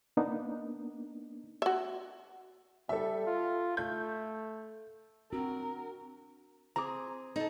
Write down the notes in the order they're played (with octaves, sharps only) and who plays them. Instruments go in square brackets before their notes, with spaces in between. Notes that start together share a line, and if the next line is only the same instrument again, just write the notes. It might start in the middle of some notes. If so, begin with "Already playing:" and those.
[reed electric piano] A#3 B3 D4 D#4
[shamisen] F#4 E5
[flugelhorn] G3 [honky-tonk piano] A4 E5
[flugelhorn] F4
[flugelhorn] A3 [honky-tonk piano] G6
[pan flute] C4 [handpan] D4 F#4 [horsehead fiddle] A#4
[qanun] C4 G#4 [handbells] A#5 D6
[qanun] C4 A4 [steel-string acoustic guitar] D#4